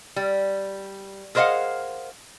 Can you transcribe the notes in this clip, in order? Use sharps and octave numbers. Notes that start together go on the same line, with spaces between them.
G3
G#4 A#4 C5 D#5 F5 F#5